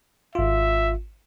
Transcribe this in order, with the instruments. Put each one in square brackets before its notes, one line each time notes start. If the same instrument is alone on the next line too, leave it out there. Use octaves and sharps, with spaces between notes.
[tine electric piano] G#1 F4 [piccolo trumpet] E5